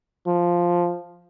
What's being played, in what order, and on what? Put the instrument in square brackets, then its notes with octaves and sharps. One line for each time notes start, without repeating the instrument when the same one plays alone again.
[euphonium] F3